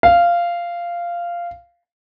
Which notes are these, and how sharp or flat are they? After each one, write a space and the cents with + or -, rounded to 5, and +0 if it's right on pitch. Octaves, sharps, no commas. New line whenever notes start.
F5 -10